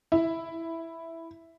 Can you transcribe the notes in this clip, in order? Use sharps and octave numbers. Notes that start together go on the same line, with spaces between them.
E4